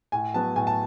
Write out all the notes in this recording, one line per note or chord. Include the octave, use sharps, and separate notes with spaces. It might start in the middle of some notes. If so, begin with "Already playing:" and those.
A2 G#5
F#3 B3 A5
A2 G#5
A5